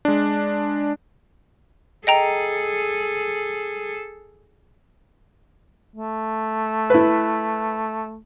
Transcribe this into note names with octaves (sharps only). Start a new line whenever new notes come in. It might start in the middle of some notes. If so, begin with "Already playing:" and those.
G#3 D4
G#4 A4 D#5 G5 A#5
A3
E4 B4